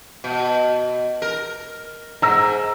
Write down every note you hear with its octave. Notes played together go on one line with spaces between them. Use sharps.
B2
A#4
G#2 A#5 E6 A#6